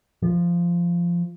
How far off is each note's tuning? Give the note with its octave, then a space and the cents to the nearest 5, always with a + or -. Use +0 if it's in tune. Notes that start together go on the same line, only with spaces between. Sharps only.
F3 -15